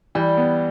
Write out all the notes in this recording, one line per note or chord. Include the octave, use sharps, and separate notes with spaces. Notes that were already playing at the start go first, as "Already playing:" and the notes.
E3 G3
B3